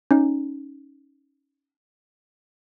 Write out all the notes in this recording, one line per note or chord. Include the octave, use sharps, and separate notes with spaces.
C#4 D#4